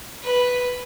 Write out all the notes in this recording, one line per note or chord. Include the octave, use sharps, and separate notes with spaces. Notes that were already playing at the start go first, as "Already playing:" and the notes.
B4